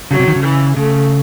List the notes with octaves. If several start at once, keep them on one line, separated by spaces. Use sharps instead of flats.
C#3 F#3
C3
D#3
C#3
E3
C#3 A3